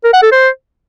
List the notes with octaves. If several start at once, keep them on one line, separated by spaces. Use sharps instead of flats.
A#4
F#5
A4
C5